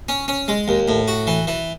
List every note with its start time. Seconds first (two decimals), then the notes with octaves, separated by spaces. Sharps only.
0.09 C#4
0.28 C#4
0.48 G#3
0.68 D#2
0.88 A2
1.08 F#4
1.27 E3
1.47 E3